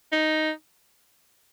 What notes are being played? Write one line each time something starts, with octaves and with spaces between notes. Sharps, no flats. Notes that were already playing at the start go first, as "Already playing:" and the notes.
D#4